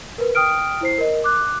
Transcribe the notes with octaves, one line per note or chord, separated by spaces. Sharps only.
A#4 B4
G5 D#6 F6 D7
E4 C5 C7
A#4 D#5
D6 F#6